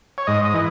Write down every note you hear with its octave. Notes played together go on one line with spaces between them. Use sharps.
C#5
G#2 D#5
D#5
E3